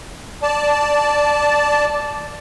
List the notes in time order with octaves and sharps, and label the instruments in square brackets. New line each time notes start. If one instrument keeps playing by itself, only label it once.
[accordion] D5 A5